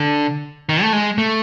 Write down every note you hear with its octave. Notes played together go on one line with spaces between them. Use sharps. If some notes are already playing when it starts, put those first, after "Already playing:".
Already playing: D3
D#3
A3
G#3
A3